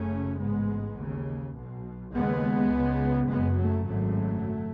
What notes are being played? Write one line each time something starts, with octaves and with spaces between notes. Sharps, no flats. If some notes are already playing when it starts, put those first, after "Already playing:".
Already playing: F#1 F#2 C#3 A3 C#4
A1 G#2 G#3 B3
D#2 C#3
B1 B2
D#2 C#3 G#3 B3
C#2 C#3
F#1 F#2 C#3 G#3 B3
F#3 A3
G#1 F#2 C#3 F#3 A3